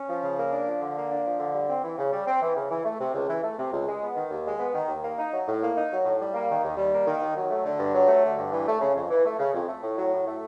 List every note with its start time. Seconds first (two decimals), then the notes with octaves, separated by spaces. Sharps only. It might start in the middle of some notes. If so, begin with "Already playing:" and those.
Already playing: C#4
0.09 F3
0.23 C#3
0.38 A#3
0.53 D4
0.67 F3
0.81 D3
0.95 A#3
1.11 D4
1.25 F3
1.39 D3
1.54 G3
1.69 C4
1.83 E3
1.98 C#3
2.13 G3
2.27 C4
2.42 E3
2.56 C#3
2.71 E3
2.85 A3
2.99 C3
3.14 C#2
3.29 E3
3.43 A3
3.58 C3
3.72 C#2
3.87 G#3
4.02 B3
4.16 D#3
4.31 D#2
4.45 G#3
4.59 B3
4.74 D#3
4.88 D#2
5.03 A#3
5.18 D#4
5.32 F#3
5.47 A2
5.62 A#3
5.76 D#4
5.91 F#3
6.05 A2
6.20 G3
6.34 A#3
6.49 D#3
6.63 D#2
6.77 G3
6.92 A#3
7.06 D#3
7.21 D#2
7.35 F#3
7.50 A3
7.65 D3
7.79 G2
7.94 F#3
8.08 A3
8.23 D3
8.38 G2
8.52 E3
8.67 A3
8.81 C#3
8.95 F2
9.10 E3
9.25 A3
9.39 C#3
9.54 F2
9.68 A3
9.83 A2
9.97 F#3
10.12 A2
10.26 A3